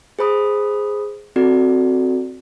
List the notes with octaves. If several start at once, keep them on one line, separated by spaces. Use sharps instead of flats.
G#4 C5 B5 D#6
C4 E4 F#4 A4 D5